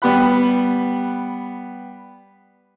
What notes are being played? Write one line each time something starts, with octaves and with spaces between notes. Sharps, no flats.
G3 B3 G4 F#5 B5 F#6